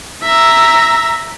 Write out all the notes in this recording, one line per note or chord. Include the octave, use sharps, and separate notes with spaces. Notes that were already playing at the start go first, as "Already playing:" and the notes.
E5 A#5